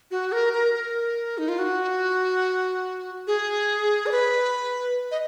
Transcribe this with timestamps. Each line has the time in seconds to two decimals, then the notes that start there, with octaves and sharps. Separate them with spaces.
0.11 F#4
0.32 A#4
0.53 A#4
0.74 A#4
1.38 D#4
1.48 F4
1.59 F#4
3.27 G#4
4.06 D5
4.11 B4
5.11 D#5